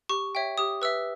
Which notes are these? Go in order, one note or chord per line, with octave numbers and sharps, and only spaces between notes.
G4 C#6
C#5 E5 G5
G4 D#6
B4 E5 E6